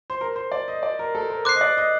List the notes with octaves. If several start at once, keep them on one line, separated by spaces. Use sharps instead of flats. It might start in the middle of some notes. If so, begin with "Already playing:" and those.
C5
A#4
C5
D5
D#5
D5
A#4
A4
A#4
C5 D6 F#6 C7
D#5
D5
D#5